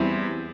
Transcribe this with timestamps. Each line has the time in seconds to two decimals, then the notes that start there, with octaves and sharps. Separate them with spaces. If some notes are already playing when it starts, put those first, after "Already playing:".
Already playing: E2 G3 C4 E4